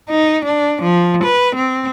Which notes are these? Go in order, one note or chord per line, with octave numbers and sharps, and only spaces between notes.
D#4
D4
F3
B4
C4